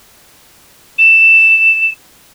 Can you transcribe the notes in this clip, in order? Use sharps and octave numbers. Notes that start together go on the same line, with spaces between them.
E7